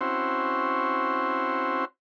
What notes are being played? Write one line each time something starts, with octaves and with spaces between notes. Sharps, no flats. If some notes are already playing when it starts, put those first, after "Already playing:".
C4 C#4 E4 F#4 C5